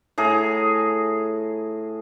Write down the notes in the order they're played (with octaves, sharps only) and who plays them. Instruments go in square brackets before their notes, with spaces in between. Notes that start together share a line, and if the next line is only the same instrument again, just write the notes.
[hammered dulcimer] A2 G#4 A#5